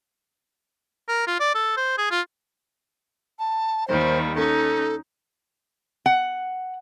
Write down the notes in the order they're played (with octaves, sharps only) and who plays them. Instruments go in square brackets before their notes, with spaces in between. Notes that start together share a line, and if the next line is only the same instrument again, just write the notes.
[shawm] A#4
F4
D5
A4
C5
G#4
F4
[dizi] A5
[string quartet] D#2 D#3 G3 [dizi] C5
[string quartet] C#4 D#4 [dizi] A4
[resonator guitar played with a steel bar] F#5